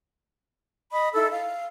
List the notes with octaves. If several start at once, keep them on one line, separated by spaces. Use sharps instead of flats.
D#5 B5 D#6
D#4 E4 A4 E6
F5